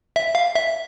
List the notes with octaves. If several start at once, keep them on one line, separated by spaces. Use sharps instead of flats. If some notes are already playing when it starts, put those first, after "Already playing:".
E5
F5
E5